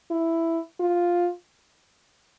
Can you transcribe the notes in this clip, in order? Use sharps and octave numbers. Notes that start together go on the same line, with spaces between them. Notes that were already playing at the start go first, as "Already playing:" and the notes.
E4
F4